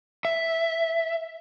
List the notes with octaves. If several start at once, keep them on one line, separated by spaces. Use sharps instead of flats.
E5